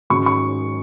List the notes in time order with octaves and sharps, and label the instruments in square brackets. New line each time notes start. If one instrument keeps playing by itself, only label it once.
[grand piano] G#2 D#3 G#3 C#4 F#4 [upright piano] C#6
[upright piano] C#6